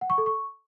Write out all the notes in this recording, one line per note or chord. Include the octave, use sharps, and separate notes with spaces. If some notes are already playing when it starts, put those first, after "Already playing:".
F#5
C#6
A4
C#6